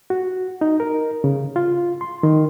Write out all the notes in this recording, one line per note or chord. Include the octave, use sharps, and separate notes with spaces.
F#4
D#4
A#4
C#3
F4
C6
D#3